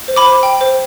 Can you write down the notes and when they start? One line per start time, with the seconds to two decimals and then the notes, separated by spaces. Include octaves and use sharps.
0.08 C5
0.16 B5 D6
0.26 C5
0.43 G5
0.61 C5